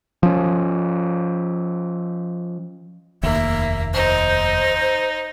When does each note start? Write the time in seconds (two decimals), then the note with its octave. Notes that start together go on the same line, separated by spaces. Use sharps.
0.23 F3 C#4
3.23 F1 D#2 A#3 E5
3.94 D#4 C5